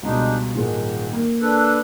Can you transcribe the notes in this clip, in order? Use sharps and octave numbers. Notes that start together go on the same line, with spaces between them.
C#2 B2 G3 G#3 D4 D#4
D#1 G#2 D#3 G#3
A#3
D4 A4 B4